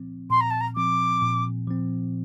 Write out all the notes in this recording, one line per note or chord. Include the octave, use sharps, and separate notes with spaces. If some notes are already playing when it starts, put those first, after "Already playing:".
Already playing: A#2 F3 C4
A#2 C6
A#5
A5
A#5
F3 C4 D6
A#2
F3 C4